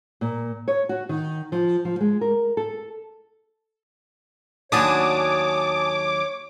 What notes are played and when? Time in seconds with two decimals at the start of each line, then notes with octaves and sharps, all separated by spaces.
0.21 A#2
0.68 C#5
0.89 F#4
1.09 D#3
1.52 F3
1.85 F3
2.00 G#3
2.21 A#4
2.57 A4
4.72 D#2 F#3 D4 C#5 G#5 A5 D6 D#6